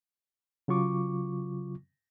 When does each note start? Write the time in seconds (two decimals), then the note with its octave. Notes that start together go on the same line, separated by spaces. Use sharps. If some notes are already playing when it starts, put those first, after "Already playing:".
0.68 C#3 F#3 F4 C#6 D6